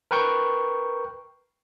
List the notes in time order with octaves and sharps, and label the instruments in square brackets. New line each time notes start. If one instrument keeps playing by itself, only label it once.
[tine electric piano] A#4 B4 G5 C#6 G6